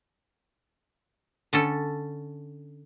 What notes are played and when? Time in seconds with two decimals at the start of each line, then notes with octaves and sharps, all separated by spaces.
1.53 D3 C#4 A4